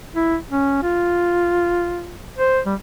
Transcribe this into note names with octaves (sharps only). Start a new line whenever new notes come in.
E4
C#4
F4
C5
G3